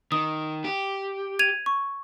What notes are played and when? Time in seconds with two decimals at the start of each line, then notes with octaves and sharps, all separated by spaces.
0.12 D#3 D#6
0.64 G4
1.39 G#6 D#7 F7
1.66 C#6